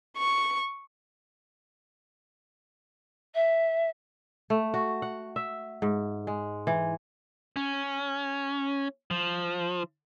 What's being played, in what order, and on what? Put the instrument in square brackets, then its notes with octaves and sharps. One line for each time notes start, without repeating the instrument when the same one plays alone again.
[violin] C#6
[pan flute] E5
[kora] A3
F#4
F#5
E5
G#2
G#3
E3
[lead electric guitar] C#4
F3